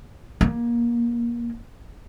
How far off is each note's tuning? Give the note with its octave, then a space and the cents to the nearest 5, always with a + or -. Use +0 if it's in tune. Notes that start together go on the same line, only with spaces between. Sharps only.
A#3 +20